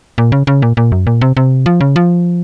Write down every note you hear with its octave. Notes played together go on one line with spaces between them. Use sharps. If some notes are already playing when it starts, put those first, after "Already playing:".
A#2
C#3
C#3
A#2
A#2
F#2
A#2
C3
C3
F3
C#3
F3